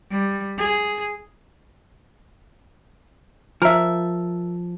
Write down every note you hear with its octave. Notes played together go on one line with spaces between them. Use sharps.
G3
G#4
F3 A#4 E5